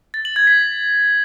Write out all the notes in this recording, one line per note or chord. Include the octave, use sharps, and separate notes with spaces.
A6
F#7
G#6
B6